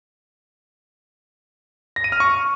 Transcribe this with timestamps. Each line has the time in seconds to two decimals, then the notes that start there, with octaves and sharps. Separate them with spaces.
1.96 A#6
2.04 D#7
2.12 F6
2.20 C#6